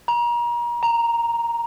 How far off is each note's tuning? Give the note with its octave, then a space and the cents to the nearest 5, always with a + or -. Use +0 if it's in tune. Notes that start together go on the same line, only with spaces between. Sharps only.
A#5 +35
A#5 +0